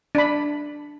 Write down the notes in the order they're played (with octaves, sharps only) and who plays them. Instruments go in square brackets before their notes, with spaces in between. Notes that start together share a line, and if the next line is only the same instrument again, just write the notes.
[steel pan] D4 B5